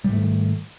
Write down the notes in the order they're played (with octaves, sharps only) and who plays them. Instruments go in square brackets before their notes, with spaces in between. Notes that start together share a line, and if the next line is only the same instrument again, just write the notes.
[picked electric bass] G3
G#2
A3
D#3